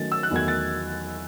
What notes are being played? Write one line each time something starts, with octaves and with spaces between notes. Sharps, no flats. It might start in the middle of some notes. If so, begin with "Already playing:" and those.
Already playing: D#3 F#3 A3 C#4 A6
E6
F#6
E2 D#3 F#3 A3 G#6
A6